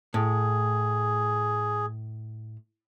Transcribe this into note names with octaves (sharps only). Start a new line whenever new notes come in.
A2 G#4